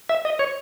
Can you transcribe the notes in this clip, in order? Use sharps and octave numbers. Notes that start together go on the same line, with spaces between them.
E5
D#5
C#5